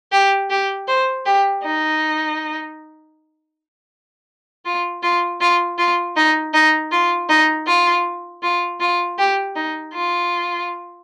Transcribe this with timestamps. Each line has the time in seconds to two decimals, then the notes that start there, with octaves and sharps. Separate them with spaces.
0.12 G4
0.50 G4
0.88 C5
1.26 G4
1.63 D#4
4.65 F4
5.03 F4
5.41 F4
5.78 F4
6.16 D#4
6.54 D#4
6.92 F4
7.29 D#4
7.67 F4
8.43 F4
8.80 F4
9.18 G4
9.56 D#4
9.94 F4